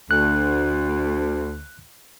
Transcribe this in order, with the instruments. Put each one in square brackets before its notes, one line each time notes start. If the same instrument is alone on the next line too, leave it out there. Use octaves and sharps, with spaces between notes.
[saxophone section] D2 [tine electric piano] F#6